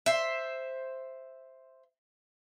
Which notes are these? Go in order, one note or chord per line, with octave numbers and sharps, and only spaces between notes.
C5 E5